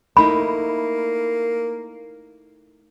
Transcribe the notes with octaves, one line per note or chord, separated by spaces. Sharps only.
A3 A#3 D#4 E4 B5